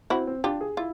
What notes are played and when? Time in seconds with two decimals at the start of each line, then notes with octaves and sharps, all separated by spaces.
0.10 C4 E4 F#4
0.27 C4
0.44 D4 F4 G4
0.61 G#4
0.77 E4 F4